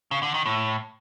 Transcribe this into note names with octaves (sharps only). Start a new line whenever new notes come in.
C#3
D3
D#3
A2